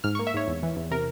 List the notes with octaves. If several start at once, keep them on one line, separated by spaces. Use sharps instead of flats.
G#2 F6
C#6
A#3
E5
G#2 C#5
E2
E3
E2
C3 A#4